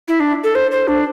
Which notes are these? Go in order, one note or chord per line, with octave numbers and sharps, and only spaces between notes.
E4
D4
A4
C5
C5
D4